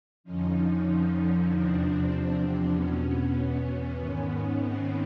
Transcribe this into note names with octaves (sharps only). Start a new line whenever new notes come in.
F2 D3 F3 C#4 D#4
E2 C3 F3 C4 D4
E2 B2 B3 C#4
G#2 D#3
C4